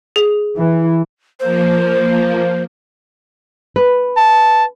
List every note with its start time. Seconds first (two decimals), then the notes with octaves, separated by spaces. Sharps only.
0.16 G#4
0.58 E3
1.40 F3 A#3 C5
3.76 B4
4.17 A5